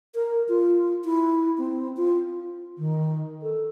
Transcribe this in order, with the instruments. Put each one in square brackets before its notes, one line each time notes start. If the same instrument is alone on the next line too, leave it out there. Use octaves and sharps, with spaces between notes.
[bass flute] A#4
F4
E4
C4
F4
D#3
A4